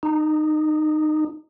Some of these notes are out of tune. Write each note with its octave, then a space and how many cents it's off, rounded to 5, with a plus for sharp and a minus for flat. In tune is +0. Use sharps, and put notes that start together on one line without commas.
D#4 -20